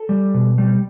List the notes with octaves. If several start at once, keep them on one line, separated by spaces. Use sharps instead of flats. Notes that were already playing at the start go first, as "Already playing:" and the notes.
Already playing: A4
G3
B2
G3